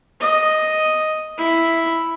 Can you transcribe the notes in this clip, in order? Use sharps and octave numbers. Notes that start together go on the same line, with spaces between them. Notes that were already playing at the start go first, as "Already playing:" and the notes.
D#5
E4